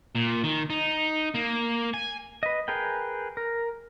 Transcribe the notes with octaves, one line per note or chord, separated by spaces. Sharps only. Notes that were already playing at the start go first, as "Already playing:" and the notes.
A#2
D#3
D#4
A#3
G#5
B4 D#5
G#4 A#4 B4 G5
A#4